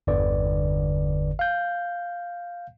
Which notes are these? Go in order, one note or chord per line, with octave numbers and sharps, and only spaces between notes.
G1 E2 D3 B4 D5
F5 G6